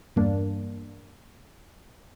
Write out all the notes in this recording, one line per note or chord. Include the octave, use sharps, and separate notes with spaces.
E2 G2 A#3 D4